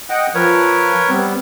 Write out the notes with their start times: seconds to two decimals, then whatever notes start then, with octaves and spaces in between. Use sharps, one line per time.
0.10 D#5 F#5 G5
0.35 F3 A#4 B4 C#5
1.09 G3 B3 C4